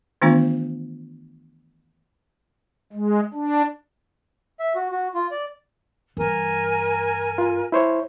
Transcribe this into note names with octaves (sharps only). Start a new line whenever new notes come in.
D#3 E3 A3 B3 D4 F4
G#3
D4
E5
F#4
F#4
F4
D5
G2 E3 A#4 G#5
F4
E4 C5 C#5